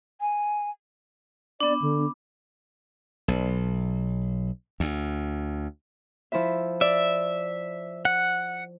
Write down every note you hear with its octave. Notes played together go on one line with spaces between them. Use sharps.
G#5
B3 D4 D5
D3
B1
D2
F3 E4 E5
D5 E5
F#5